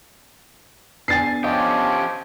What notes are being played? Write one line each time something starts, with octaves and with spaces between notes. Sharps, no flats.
B3 D4 G#5 A6 C7
F3 C#4 G4 D#5